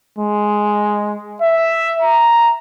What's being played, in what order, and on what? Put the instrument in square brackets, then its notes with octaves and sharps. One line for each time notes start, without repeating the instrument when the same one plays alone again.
[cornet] G#3
E5
A#5